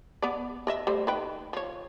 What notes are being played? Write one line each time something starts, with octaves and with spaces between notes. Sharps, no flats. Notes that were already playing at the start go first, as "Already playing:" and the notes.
B3 D5
A#4 D#5 E5
G3 A3 C5
D#3 B4 G5
F3 C#5